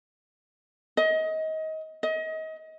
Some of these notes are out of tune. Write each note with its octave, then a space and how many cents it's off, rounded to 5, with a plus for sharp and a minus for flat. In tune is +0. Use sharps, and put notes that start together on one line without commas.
D#5 +25
D#5 +30